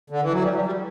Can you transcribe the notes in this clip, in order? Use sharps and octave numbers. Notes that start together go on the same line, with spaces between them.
D3
E3
F#3
G3
G3
G3